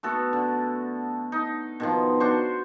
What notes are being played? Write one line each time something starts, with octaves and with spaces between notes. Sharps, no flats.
A3 B3 F#4 A4
D3
D#4
B2 D#3 F3
D4 F#4 C5 C#6